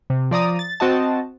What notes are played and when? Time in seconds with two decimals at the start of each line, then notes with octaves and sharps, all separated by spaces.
0.10 C3
0.31 F3 D5 A#5 D#6
0.59 A6
0.80 C4 F#4 D#5 A5